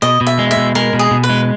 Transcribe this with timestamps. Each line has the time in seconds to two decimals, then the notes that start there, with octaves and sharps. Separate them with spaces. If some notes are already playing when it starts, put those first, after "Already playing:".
0.02 B2 D#5
0.21 B2
0.27 E5
0.39 G#3
0.51 E5
0.57 B2
0.75 G#3 A#4
0.93 B2
0.99 G#4
1.11 B2
1.23 B4
1.29 G#3